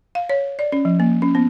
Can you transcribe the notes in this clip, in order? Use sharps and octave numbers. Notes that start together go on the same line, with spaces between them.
F5
C#5
D5
C#4
F3
A#3
C#4
B3